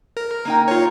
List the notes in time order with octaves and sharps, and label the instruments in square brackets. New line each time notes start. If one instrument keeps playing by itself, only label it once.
[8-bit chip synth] A#4
[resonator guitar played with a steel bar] A#3 D#4 G5
[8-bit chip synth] F4 C#5